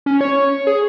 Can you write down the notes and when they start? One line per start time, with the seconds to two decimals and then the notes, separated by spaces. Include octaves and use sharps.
0.06 C#4
0.21 C#5
0.67 G#4